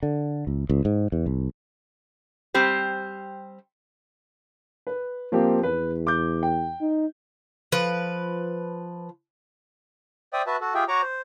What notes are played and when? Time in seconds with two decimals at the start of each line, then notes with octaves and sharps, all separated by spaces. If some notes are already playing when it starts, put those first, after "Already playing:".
0.03 D3
0.47 C#2
0.70 C#2
0.85 G#2
1.12 E2
1.26 C2
2.54 G3 C4 G4 C5
4.87 B4
5.32 F3 A#3 C4 G4
5.63 E2 B4
6.07 D6 G6
6.43 G5
6.81 D#4
7.72 F3 B4
10.33 C5 D5 E5 G5 D#6
10.47 F#4 B4 E5 A5
10.61 F#4 A4
10.75 F4 G4 G#4 E5 G5
10.88 F#4 C#5 A#5 C#6 D6
11.02 C5